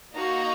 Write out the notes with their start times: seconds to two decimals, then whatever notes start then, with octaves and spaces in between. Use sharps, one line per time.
0.15 A#3 D#4 F#4 A#5